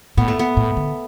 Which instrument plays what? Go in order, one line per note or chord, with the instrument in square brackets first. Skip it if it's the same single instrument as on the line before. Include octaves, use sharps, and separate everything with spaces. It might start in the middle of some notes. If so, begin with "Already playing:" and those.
[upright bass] A2 [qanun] B3
[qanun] A3
B3
[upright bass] A2
D3